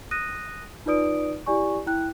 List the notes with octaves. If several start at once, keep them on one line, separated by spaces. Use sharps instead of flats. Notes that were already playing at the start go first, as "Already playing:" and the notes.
D#6 F#6 A#6 D#7
D#4 F4 B4 D5 D#6 D7
E4 G4 D5 G#5 C#6
E4 G5 F#6